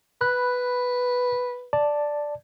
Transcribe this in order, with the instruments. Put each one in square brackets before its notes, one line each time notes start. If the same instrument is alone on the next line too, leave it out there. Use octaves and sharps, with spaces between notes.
[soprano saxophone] B4 [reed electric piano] B5 F#6
[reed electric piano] D5 A5